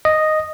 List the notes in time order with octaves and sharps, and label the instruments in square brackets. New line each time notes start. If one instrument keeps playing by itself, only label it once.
[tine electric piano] D#5